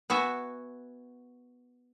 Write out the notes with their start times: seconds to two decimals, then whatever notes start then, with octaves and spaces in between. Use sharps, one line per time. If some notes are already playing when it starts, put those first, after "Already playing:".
0.10 B3 F#4 E5 G#5